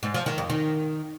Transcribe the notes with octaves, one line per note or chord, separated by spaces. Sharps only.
G#2
F3
D#3
F2
D#3